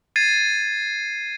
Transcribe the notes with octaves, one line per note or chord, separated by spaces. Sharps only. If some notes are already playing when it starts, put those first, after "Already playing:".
G#6 A6 C7 D#7